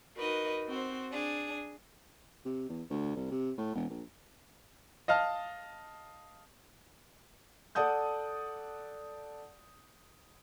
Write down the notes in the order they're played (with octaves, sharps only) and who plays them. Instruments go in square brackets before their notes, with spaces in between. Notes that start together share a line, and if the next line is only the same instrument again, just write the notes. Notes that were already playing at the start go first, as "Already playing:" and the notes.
[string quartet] D#4 F#4 A#4 B4 D#5
C4 F#4 C5
D4 G#4
[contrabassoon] C3
E2
D2
C2
C3
A2
E1
A#1
[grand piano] D#5 F5 A5 F6
[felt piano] A4 D5 F#5 A5 D#6 G6